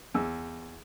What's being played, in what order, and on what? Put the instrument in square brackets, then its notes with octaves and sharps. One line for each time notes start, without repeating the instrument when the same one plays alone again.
[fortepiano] E2 E6